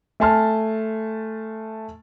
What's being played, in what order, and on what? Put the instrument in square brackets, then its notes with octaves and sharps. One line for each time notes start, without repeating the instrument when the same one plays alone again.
[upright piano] A3 G#5 A5 C6 F6